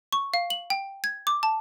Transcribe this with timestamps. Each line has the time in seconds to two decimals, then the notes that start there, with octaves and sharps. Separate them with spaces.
0.13 C#6
0.34 F5
0.50 F#7
0.70 G5
1.04 G#6
1.27 D6
1.43 A5